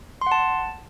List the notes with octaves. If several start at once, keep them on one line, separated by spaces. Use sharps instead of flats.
C6
F#5
A5